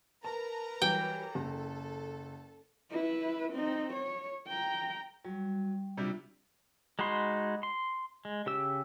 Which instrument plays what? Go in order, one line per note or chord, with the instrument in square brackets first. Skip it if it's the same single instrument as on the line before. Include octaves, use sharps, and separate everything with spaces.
[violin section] A#4 B4 A#5 [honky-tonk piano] A5
[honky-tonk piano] E3 F#3 G3 [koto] G5
[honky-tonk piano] F#1 [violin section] A4
[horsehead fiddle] E4 B4
C4 D#4
C#5
G5 A#5
[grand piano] F#3 [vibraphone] G3
[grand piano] C3 F#3 G3 [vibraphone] D4 F4
[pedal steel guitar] G#3 D#4 F#4 B5 C6
C6
G#3
C#3 G4 E6